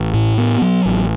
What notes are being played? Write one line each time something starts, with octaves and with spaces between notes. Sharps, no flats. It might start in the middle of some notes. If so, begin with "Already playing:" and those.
Already playing: A1
A2
B3
F#3
A1